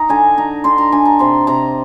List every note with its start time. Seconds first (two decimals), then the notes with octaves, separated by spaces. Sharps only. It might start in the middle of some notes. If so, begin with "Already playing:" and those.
Already playing: D#4 A#5
0.09 D3 G#5
0.38 D#4 A#5
0.64 D3 C6
0.78 A#5
0.92 D4 G#5
1.05 A#5
1.19 C3 C6
1.47 C3 A#5